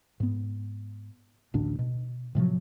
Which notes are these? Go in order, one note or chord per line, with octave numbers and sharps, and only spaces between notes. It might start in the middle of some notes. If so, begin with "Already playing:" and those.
G#2 B3
A1 D2 A2 D4
B2
A2 C3 F3 F#3